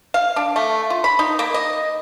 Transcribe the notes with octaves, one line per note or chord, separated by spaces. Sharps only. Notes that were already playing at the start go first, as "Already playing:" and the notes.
F5
D4
A3
F4
B5
D#4
A#3
D#5